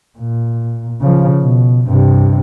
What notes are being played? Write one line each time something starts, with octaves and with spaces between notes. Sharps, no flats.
A#2
C#3 F3
B2
G2 C3